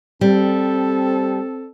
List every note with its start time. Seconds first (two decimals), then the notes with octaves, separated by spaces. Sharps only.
0.21 G3 C4 A4